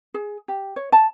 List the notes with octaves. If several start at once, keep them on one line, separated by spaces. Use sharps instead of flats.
G#4
G4
C#5
A5